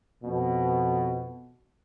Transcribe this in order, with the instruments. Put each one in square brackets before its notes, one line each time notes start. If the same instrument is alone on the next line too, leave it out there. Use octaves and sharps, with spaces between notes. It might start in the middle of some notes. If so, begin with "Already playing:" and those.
[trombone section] F2 B2